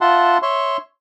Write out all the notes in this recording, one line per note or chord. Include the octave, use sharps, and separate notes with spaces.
F4 E5 F#5 A5 C6
C#5 E5 C6 C#6